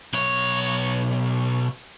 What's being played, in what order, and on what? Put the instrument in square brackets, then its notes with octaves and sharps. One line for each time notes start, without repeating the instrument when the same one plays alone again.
[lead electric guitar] B1 C#5